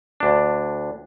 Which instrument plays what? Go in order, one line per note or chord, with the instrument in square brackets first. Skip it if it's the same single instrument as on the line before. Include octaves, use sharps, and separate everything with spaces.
[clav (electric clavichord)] D2 D4